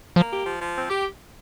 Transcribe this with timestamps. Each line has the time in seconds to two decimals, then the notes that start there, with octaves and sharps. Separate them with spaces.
0.16 F3 A#3
0.31 G4
0.45 F3
0.61 F3
0.76 C4
0.90 G4